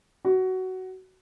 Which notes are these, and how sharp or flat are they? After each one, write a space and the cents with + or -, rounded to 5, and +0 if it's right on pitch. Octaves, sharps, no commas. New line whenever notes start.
F#4 +15